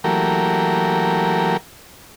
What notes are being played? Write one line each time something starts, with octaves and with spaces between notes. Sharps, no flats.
E3 F#3 A3 A#3 G4 A#4